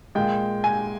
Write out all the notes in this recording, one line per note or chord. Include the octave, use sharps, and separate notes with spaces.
A#2 G#3 G5
G#5